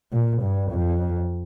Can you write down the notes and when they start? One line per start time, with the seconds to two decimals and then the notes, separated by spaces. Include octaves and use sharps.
0.12 A#2
0.42 G2
0.72 F2